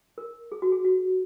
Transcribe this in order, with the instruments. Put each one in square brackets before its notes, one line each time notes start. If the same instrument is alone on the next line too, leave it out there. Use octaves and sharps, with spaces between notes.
[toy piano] A#4
G#4
F#4
G#4
F#4